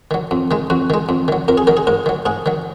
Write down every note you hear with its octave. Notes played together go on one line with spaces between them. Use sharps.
D#3 F#3
F2
D#3 G#3
F2 F#4
D#3 G#3
F2
D#3 F#3
F2 A#4
G#4
D#3 F#3 A#4
G#4
G#2 A#4
D#3 F#3
G#2 G#4
D#3 F#3